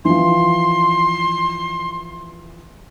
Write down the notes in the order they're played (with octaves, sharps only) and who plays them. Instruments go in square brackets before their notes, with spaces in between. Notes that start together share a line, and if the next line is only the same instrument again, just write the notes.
[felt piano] E3 F3 [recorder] C6